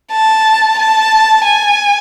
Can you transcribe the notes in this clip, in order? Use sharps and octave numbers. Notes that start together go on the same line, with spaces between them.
A5
A5
G#5